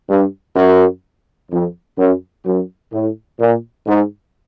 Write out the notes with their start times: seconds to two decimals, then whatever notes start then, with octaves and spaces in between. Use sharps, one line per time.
0.09 G2
0.56 F#2
1.51 F2
1.97 F#2
2.45 F#2
2.93 A2
3.40 A#2
3.87 G#2